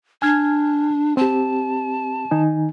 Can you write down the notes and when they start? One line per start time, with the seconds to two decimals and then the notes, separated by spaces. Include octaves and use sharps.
0.22 D4 G#5 F6 G#6
1.17 C4 G4 A5
2.31 D#3 D#4 G#5